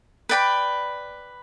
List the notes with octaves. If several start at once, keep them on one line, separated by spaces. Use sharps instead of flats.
B4 D5 G5 B5